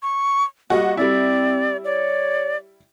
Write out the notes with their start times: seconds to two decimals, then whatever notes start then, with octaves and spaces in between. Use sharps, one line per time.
0.02 C#6
0.70 G3 A#3 F#4 D#5
0.97 G3 C4 E4 D5
1.85 C#5 D5